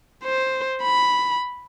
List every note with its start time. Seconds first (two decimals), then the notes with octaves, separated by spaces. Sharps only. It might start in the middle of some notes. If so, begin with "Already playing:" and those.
0.25 C5
0.83 B5